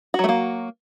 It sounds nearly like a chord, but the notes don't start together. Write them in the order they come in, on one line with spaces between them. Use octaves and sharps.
F#4 F#3 A3 A#3